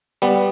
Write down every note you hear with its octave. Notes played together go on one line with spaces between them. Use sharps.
G3 B3